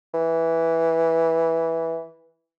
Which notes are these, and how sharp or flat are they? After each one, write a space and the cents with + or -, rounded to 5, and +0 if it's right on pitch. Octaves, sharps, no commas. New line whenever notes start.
E3 -5